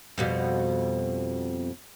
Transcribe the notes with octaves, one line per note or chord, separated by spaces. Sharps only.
F2 B2 G3